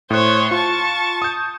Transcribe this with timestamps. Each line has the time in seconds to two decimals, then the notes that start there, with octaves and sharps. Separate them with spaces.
0.10 A2 C5 C#5 F#6
0.51 F4 A5 C#6
1.22 D#6 G6